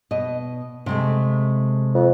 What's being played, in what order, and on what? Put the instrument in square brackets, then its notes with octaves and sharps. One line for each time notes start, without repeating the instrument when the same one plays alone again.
[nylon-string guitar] B2 D#5
C3 G#3 A3
[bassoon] F2